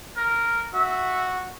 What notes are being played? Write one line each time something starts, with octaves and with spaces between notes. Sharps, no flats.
A#4
F#4 E5